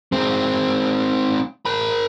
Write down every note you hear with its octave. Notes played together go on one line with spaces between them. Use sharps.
G#3 C4
A#4 B5